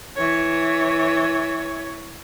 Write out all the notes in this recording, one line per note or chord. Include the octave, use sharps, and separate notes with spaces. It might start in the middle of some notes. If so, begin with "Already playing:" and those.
E3 C#5